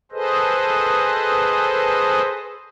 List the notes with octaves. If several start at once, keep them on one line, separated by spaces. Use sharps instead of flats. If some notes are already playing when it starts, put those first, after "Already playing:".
G#4 A4 B4 C5 D#5